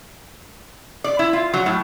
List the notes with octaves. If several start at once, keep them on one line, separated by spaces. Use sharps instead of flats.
D5
E4
F4
F#3
A2